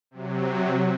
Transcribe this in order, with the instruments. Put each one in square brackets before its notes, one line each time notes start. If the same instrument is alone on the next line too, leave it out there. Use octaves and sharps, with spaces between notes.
[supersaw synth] C3 F#3